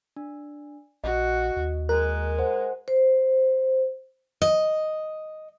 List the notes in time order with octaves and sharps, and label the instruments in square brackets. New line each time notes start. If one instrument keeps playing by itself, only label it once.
[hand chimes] D4
[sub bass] A#1 [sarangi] F#4 [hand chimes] D#5
[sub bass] D#2
[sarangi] G#3 [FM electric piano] A#4 [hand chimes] F#6
[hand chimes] C5 F#5
[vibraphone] C5
[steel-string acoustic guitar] D#5